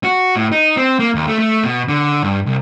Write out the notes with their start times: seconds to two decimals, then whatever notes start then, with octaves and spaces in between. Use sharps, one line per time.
0.04 F#4
0.36 A2
0.52 D#4
0.77 C4
1.00 A#3
1.15 D#2
1.27 A3
1.39 A3
1.63 B2
1.89 D3
2.23 G2
2.46 C2